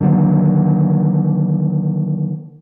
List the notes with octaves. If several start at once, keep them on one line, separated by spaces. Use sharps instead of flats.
D3 D#3 F#3 A#3